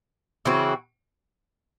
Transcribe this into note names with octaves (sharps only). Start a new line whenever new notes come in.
C#3 E3 C4 F#4